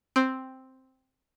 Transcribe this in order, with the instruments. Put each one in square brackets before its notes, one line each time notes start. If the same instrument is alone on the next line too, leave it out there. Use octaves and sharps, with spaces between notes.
[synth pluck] C4